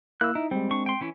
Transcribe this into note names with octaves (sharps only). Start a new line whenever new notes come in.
A#3 E4 E6 F#6
D#4 E4
G3 G#3 C4
D4 C#6
G5 C6
E3 C#4 E4